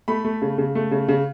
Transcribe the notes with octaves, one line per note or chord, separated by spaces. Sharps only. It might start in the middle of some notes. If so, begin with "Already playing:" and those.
A3 B5
A3
C#3
C#3
A3
C#3
C#3